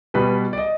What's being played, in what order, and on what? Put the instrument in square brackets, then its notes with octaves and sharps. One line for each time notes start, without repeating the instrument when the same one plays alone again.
[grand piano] B2 G3 B4
D5
D#5